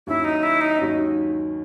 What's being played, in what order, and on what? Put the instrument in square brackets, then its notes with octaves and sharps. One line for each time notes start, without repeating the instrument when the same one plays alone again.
[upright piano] D#2 D#3 F#3 C#4 [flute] E4
[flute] D#4
E4
D#4
[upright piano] D#2 D#3 F#3 C#4